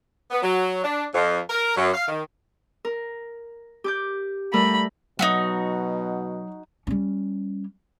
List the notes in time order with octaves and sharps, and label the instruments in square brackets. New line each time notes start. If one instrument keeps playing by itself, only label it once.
[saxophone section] B3
F#3
D4
F2
A#4
F#2
F5
D#3
[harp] A#4
G4 D6 G6
[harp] G3 A3 A#4 [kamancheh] B5
[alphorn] B2 [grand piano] F#3 [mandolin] D#4 E4 F#4
[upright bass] G3 C#4